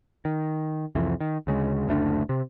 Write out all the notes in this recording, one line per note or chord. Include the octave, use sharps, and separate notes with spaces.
D#3
C2 F2 E3
D#3
D2 C#3 G#3
F#1 D2 A3 D4
C3